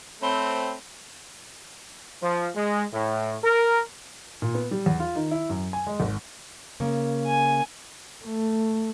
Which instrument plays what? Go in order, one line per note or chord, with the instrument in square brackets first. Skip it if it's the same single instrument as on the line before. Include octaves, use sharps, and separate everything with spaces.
[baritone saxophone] A3 [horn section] C4 [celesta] C#5 B5 G7
[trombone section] F3
G#3
A2
A#4
[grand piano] A#2
B3
G3
E2
F4
D#3
E4
F#2
G#5
G#3
G#1
[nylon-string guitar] C#3 A#3
[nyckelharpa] G#5
[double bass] A3